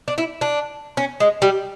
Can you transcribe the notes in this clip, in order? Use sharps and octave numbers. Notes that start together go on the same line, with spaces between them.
D4
E4
D4
C#4
G#3
G3